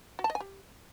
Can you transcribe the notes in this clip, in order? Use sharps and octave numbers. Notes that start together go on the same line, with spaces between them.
F#4
A5
D#5
G#5
G4